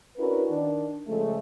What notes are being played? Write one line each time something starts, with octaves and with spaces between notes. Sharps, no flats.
C#4 D4 E4 F#4 A#4 B4
D#3 D4
C#3 F3 G#3 A3